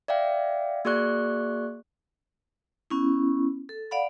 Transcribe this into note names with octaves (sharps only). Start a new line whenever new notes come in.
D5 E5 F5 G5
A#3 F#4 G#4 D5 C#6 F#6
B3 C#4 E4
A4
D5 F5 F#5 B5